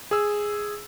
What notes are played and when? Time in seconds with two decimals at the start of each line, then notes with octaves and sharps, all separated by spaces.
0.11 G#4 E6